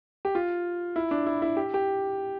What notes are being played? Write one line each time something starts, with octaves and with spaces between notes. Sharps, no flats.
G4
F4
E4
D4
E4
E4
G4
G4